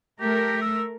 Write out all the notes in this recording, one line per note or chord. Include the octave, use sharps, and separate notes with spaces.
A3 G4 A#4
E6